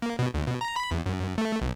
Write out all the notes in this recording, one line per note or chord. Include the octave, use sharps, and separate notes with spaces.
A#3
B2
D2
B2
A#5
B5
E2
F#2
A3
B1